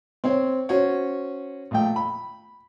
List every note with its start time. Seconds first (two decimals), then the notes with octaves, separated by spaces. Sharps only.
0.24 C4 C5 C#5
0.69 C#4 F#4 C5 C#5
1.71 A#1 A3 G5
1.96 B5